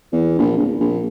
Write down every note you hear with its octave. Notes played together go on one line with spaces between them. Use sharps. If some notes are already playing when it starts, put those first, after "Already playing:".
E2
A#1
D1
A#1